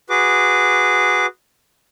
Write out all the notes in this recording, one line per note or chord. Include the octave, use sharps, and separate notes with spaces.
F#4 G#4 B4 D6